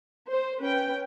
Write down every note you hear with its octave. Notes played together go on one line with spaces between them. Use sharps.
C5
C#4 B4 G5